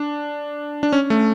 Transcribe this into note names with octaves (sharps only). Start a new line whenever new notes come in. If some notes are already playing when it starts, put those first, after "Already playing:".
Already playing: D4
D4
C#4
A3